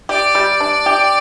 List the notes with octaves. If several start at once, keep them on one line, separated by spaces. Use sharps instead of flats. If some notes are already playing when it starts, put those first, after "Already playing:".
G4 D5
G3
D4
G4